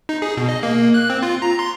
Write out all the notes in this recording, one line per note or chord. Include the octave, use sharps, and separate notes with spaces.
D#4
G#4
B2
D#5
A#3
F#6
C4
F4
A#5
C6